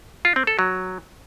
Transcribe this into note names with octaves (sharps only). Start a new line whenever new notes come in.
F4
C4
A4
F#3